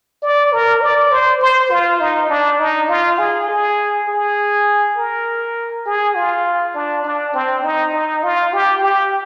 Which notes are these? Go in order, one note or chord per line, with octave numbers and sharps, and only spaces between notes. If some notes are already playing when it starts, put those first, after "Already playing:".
D5
A#4
D5
C5
C5
F4
D#4
D4
D#4
F4
G#4
G#4
G#4
A#4
G#4
F4
D4
D4
C4
D#4
D#4
F4
G4
G4